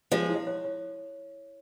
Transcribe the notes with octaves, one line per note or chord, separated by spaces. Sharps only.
F3 G#3 C#5
E4
C#5
C#5